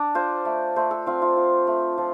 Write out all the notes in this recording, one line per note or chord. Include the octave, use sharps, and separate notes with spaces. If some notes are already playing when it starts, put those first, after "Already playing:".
Already playing: D4 D5
F4 C5
A3
A3 C5
A4
C4 F4
F4
F4
A3
F3